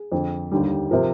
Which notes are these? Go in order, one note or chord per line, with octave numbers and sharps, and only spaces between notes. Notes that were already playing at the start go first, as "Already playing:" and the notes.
Already playing: G#4
F2 D3 F3
D#2 D3 G3
C3 F3 A#4